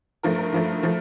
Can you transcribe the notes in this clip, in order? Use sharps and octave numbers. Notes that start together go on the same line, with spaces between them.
G2 F3 A3 A#4
A#4
G2 F3 A3
F3 A3